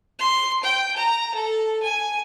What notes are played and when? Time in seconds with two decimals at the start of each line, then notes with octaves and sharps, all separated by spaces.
0.19 C6
0.63 G5
0.97 A#5
1.34 A4
1.83 G#5